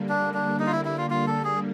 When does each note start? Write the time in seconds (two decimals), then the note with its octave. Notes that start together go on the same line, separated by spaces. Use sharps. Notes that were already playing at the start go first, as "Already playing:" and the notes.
Already playing: D3 G3 A#3
0.09 D4
0.34 D4
0.60 D#4
0.67 F4
0.72 E4
0.85 E4
0.98 F4
1.10 F4
1.27 A4
1.44 G#4